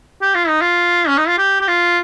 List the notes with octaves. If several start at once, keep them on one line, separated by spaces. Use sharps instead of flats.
G4
F4
D#4
F4
C#4
D#4
F4
G4
G4
F4